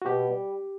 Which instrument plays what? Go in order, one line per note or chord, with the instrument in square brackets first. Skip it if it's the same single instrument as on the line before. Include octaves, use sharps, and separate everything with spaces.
[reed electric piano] F#4
[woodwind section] B2 [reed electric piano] G4
[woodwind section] G3